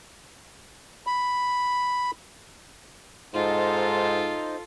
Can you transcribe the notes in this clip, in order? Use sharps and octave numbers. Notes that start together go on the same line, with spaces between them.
B5
G#2 D#4 F4 A4 C5 D#5